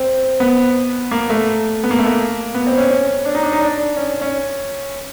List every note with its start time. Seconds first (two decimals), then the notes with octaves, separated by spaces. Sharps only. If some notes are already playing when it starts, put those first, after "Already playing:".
Already playing: C4
0.40 B3
1.11 A#3
1.30 A3
1.84 B3
1.91 A#3
1.99 A3
2.06 A#3
2.54 B3
2.67 C4
2.78 C#4
2.90 C#4
3.25 D4
3.35 D#4
3.43 D4
3.53 D#4
3.62 D4
3.96 C#4
4.21 C#4